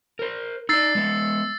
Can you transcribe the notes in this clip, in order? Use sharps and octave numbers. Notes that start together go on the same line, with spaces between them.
A#4 C5
D#4 D5 E6 A6 C7
G#3 B3